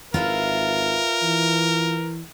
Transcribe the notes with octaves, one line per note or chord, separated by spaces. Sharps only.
G#1 F4 A#4 B4 E5
E3